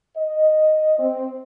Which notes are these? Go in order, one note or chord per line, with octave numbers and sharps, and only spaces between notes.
D#5
C4